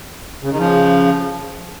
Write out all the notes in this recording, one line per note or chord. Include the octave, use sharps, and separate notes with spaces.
C#3
D#3
C#3 F3